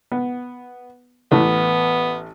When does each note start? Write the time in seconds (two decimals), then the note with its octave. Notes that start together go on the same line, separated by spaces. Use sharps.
0.12 B3
1.32 A1 E3 A3 B3